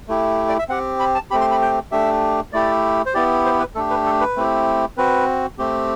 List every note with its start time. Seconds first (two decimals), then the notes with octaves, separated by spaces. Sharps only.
0.08 A3 E4 G4
0.49 D5
0.59 E5
0.69 C4 G4 F#5
1.00 B5
1.15 A5
1.31 A3 C4 G4 B5
1.41 C6
1.51 B5
1.61 G5
1.91 A3 D4 G4 E5
2.53 A3 E4 G4 D5
3.06 C5
3.14 B3 E4 G4 D5
3.45 C5
3.60 B4
3.75 A3 D4 G4 A4
3.90 B4
4.06 A4
4.21 B4
4.36 A3 C4 E4 G4
4.97 C4 F#4 B4
5.59 A3 C4 G4